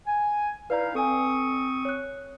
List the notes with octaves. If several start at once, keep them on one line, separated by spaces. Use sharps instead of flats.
G#5
D#4 E4 B4 D5 F5 A#5
C4 A4 G#5 C#6 D#6
C#5 F#6